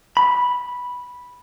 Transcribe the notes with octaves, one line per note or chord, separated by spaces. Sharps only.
B5